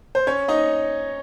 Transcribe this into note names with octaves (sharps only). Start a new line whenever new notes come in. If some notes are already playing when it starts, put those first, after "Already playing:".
C5
C#4 C#5
D#4 D#5